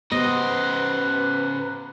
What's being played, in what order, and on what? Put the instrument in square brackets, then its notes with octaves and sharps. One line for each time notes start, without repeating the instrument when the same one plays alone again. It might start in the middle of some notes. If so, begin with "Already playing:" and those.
[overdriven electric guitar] C#3 C5 [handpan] B3 G4 [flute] B4 [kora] D#5